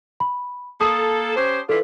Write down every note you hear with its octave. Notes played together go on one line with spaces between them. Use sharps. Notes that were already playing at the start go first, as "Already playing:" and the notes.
B5
A#3 A4 A5 D#6
C#4 G4 C5
E3 D4 F4 A4 B4